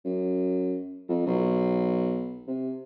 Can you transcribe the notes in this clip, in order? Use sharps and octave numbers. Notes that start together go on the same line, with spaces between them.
F#2
F2
B1
C3